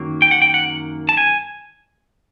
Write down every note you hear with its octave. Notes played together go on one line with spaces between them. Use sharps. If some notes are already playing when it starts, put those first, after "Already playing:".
Already playing: F#2 D#3 F#3 A#3
G5
F#5
G5
F#5
A5
G#5